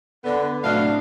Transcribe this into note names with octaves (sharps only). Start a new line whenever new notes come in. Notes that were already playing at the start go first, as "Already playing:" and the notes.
D3 B3 B4 B5
A2 C3 F#3 D4 D#5 F5